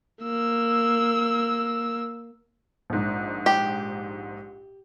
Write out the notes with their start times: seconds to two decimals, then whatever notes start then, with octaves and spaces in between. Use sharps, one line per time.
0.22 A#3 E6
2.90 A#1 G#2
3.46 G4